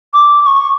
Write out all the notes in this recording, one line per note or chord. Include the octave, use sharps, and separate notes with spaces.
D6
D6
C#6